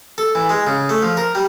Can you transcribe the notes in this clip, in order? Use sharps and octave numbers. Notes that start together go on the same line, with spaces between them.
A4
E3
G#3
C#3
A3
F3
A#4
G3